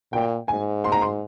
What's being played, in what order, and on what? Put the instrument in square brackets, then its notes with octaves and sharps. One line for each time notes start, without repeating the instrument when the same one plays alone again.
[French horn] A#2 [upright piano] G5
[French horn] G#2 [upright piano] G#5
[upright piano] C6
A#5
C6